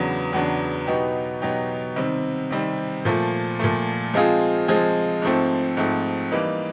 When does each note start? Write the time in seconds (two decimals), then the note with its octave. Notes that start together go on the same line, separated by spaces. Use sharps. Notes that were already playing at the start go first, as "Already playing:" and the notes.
Already playing: E2 C#3 F#3 B3 D4
0.33 E2 C#3 F#3 B3 D4
0.87 B2 F#3 B3 D#4 G4
1.42 B2 F#3 B3 D#4 G4
1.96 C3 D#3 G3 C4
2.51 C3 D#3 G3 C4
3.05 A#2 F3 A3
3.59 A#2 F3 A3
4.14 F3 G#3 C4 F4 G#4
4.68 F3 G#3 C4 F4 G#4
5.22 G#2 F3 A3 C4
5.77 G#2 F3 A3 C4
6.32 E3 G3 A#3 D#4